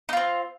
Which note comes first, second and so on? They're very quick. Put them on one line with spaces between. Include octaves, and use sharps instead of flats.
D#4 F4 C4